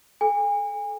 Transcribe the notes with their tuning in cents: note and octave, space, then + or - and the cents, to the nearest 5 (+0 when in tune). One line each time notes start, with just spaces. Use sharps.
A4 -25 G#5 -35